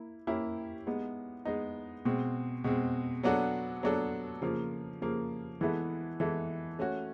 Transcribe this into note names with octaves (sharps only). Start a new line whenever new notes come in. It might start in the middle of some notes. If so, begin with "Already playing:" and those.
Already playing: A#3 E4
A#3 C#4 E4 G4
G#3 B3 D#4
G#3 B3 D#4
B2 G#3 C4
B2 G#3 C4
F#3 B3 D4 F#4 A4
F#3 B3 D4 F#4 A4
C#3 F3 A#3
C#3 F3 A#3
E3 G#3 B3 E4 A4
E3 G#3 B3 E4 A4
A3 C#4 F#4